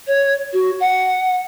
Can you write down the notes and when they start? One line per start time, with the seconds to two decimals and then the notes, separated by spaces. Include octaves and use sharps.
0.07 C#5
0.53 F#4
0.80 F#5